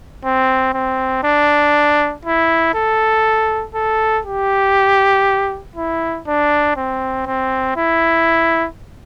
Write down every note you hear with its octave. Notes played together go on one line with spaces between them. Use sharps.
C4
C4
D4
E4
A4
A4
G4
E4
D4
C4
C4
E4